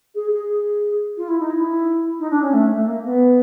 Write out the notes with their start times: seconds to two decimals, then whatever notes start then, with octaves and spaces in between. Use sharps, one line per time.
0.14 G#4
0.31 G#4
1.16 F4
1.27 E4
1.39 D#4
1.50 E4
2.19 D#4
2.30 D4
2.41 C#4
2.53 A3
2.75 A3
2.86 A#3
3.04 B3